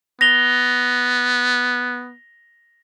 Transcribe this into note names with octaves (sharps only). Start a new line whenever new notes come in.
B3 A#6 F7 G7